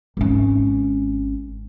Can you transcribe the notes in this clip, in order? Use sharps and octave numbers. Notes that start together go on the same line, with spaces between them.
G#1 C#4